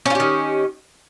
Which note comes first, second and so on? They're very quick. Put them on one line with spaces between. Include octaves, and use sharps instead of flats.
C#4 F4 G4 D#3